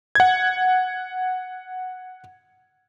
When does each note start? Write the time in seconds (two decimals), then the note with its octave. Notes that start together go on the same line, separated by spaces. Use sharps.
0.15 F#5 G#6